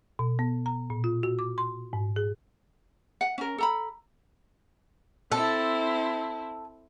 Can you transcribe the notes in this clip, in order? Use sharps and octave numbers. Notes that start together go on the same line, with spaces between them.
B2
B3
A#5
A#2
F4
F#4
D6
C6
G#2
G#4
F#5
C#4 A#4
A4 A#5 B5
C4 E4 A4